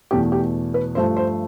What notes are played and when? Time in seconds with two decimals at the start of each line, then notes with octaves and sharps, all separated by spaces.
0.11 E2 B2 A3 G4
0.32 G4
0.74 B4
0.95 G2 F3 A3 C5
1.17 C5